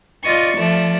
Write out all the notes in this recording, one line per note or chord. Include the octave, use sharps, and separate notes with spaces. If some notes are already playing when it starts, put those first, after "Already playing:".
F4 D5 D#5 C#6
F3 A3 D5